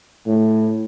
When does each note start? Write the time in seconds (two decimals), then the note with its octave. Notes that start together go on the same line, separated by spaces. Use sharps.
0.27 A2